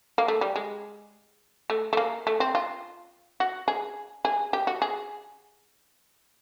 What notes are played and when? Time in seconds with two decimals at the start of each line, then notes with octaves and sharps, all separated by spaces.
0.18 A#3
0.28 A3
0.41 G3
0.56 G#3
1.70 A3
1.93 A3
1.97 A#3
2.27 A3
2.40 C4
2.55 F4
3.40 F#4
3.68 G#4
4.25 G#4
4.53 G4
4.67 F#4
4.82 G#4